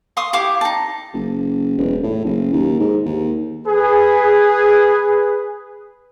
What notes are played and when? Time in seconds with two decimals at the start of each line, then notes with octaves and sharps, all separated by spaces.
0.17 F5 C6 C#6 D#6
0.33 E4 G4 F5 D6
0.61 D#4 A5
1.13 F#1
1.78 E1
2.03 A2
2.25 F#1
2.53 D#2
2.80 G#2
3.06 D#2
3.67 G#4 B4